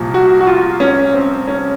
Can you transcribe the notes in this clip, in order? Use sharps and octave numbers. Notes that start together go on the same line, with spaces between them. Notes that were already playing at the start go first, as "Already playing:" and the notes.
Already playing: C2 A#2 F3
F#4
F#4
F4
C#4
C4
C#4